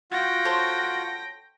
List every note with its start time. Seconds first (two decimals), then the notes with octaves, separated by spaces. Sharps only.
0.12 F4 F#4 F#5 G5 A#6
0.45 A4 C5 C#5